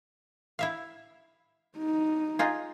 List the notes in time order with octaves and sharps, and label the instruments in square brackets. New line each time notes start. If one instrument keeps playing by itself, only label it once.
[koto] E4 E5 F5
[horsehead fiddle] D#4
[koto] D#4 F4 G#4